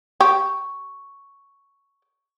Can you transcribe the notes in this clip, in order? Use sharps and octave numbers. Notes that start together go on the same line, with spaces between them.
G4 C#6